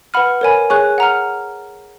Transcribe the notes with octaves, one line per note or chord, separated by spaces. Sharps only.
B4 F#5 B5 F6
A#4 C#5 G#5 B5
G#4 C#5 G#5 C#6 F#6
F#5 A#5 F6